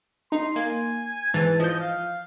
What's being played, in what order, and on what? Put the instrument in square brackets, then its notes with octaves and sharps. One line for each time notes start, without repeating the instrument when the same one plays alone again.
[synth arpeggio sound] D#4 [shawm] C6
[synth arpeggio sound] A#3 [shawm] G#5
[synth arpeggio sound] G#2 E3 [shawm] A5
[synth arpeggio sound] F3 G6 [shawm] D#5
[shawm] F5